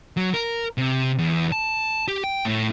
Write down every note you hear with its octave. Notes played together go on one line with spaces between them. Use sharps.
F#3
A#4
C3
E2
A5
G4
G5
A2